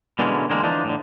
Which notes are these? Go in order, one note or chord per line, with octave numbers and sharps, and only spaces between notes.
B2 D3 E3 G#3 A#3 C#4
D3 E3 G#3 A#3 C4
D3 E3 F3 D4 D#4
A2 D3